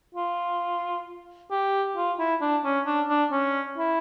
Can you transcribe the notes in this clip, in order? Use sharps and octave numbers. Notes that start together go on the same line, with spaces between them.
F4
G4
F4
E4
D4
C#4
D4
D4
C#4
E4